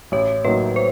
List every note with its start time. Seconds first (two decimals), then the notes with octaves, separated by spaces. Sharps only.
0.12 A1 C#5
0.44 A2 F#3 A#3 D#4 B4
0.76 C5